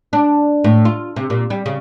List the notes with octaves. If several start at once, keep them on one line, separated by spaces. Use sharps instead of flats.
D4
A2
F4
C3
A#2
G3
C#3